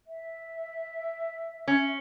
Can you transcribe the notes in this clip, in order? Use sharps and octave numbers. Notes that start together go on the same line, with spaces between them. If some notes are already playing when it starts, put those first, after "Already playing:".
E5
C#4